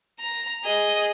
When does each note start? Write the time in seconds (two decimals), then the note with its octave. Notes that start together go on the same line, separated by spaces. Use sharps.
0.20 A#5
0.64 G#4 D#5